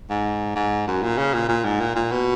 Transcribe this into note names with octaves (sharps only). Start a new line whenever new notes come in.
G#2
G#2
F#2
A#2
C#3
A#2
A#2
G#2
A#2
A#2
B2